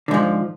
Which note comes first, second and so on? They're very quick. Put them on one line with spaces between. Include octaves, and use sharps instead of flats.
D3 G#2 F3